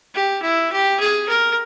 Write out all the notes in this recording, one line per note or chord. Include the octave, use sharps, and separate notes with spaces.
G4
E4
G4
G#4
A#4